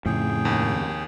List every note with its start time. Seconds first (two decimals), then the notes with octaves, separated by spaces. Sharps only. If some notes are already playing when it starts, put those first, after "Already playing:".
0.06 F2 A2 C#3 G#4 G5
0.45 D#2